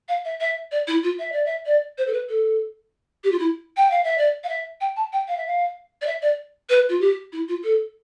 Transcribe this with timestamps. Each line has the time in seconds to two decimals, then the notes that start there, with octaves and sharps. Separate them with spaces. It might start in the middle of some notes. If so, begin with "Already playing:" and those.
0.09 F5
0.25 E5
0.40 E5
0.72 D5
0.88 E4
1.03 F4
1.19 E5
1.32 D5
1.46 E5
1.66 D5
1.98 C5
2.07 A4
2.13 B4
2.29 A4
3.24 G4
3.32 F4
3.39 E4
3.77 G5
3.91 F5
4.04 E5
4.18 D5
4.44 F5
4.49 E5
4.81 G5
4.96 A5
5.13 G5
5.28 F5
5.37 E5
5.47 F5
6.02 D5
6.07 E5
6.22 D5
6.70 B4
6.89 F4
7.01 G4
7.33 E4
7.48 F4
7.64 A4